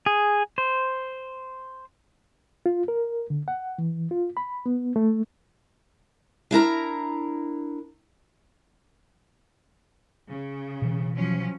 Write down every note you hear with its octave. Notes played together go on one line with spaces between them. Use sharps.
G#4
C5
F4
A#4
D3
F#5
E3
F4
B5
B3
A3
D4 E4 A#4 A#5
C#3
B2 E3
F3 F#3 C#4